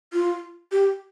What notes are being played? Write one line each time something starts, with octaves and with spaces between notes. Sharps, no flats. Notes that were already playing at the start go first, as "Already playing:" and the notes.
F4
G4